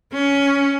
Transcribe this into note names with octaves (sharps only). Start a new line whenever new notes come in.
C#4